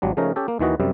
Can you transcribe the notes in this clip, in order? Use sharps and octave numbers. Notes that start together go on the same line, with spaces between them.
G#1 F#3 G3 D4
C#3 F3 A3 C#4 D#4 A#4
C#4 G4 A4
A#3
D#2 D#3 E3 F#4 D#5
F#2 C3 G3